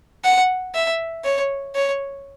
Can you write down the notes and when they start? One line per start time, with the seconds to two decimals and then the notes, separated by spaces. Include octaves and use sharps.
0.24 F#5
0.74 E5
1.24 C#5
1.75 C#5